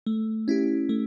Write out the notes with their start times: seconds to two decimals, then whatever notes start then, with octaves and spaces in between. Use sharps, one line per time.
0.06 A3
0.48 C#4 E4 G4
0.89 A3